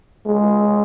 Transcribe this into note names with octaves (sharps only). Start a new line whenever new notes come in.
G#3